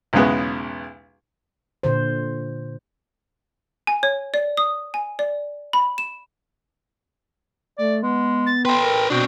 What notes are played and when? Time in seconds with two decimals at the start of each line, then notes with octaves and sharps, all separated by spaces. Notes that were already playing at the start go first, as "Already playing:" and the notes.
0.13 B1 E2 C#3 G#3 B3
1.83 A#2 D3 C5
3.87 G#5
4.03 C#5
4.34 D5
4.57 D#6
4.94 G#5
5.19 D5
5.73 B5
5.98 E7
7.78 A3 D5
8.03 G#3 B3
8.46 A6
8.65 A4 B4 G5 C6
8.83 A#4
9.10 B2 C4 D4 F#4